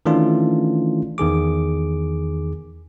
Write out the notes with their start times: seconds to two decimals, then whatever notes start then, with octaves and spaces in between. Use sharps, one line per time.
0.06 D#3 E3 A3 C#4 D4 F4
1.18 E2 D#3 G#4 D6